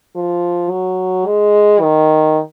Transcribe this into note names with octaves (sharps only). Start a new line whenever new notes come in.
F3
F#3
G#3
D#3